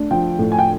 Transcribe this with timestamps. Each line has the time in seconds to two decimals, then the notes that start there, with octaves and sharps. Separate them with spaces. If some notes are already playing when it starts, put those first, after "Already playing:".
Already playing: A3 D4
0.11 F3 G5
0.39 A2
0.52 G#5
0.59 G5